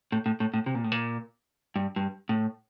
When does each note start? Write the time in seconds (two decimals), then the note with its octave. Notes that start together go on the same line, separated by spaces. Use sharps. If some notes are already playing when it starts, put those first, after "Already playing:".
0.12 A2
0.26 A2
0.40 A2
0.54 A2
0.66 C3
0.75 A#2
0.84 A2
0.92 A#2
1.76 G2
1.96 G2
2.29 A2